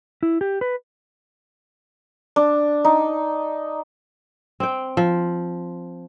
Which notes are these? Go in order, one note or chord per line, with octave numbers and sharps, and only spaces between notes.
E4
G4
B4
D4
D#4
C4 G5
F3